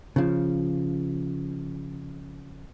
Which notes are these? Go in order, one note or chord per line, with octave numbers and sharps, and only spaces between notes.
C#3 F3